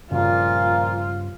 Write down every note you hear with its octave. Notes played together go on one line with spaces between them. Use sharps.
G2 A#2 C#3 F3 F4